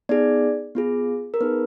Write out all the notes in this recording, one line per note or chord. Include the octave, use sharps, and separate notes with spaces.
B3 D#4 G#4 D5
B3 F4 G#4
A#4
B3 D#4 G#4 B4